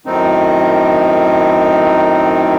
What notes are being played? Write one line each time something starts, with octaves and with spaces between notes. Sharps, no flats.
F#2 A2 D#3 C4 D#4